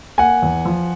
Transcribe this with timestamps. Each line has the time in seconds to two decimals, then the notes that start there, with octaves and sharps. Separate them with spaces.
0.18 A#3 F#5 G#5
0.42 E2
0.65 F3